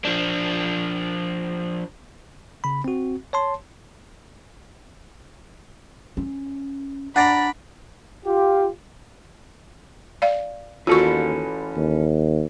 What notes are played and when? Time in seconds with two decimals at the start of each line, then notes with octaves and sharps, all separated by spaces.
0.05 F3 D4
2.64 C#3 B5
2.84 C4 F#4
3.33 C#5 A5 C6
6.17 C#4
7.16 D4 D5 F#5 A#5 B5 A6
8.26 F4 G4
10.22 D5 F5
10.87 D#2 E3 C#4 F4 F#4 A4 C#6
11.77 D#2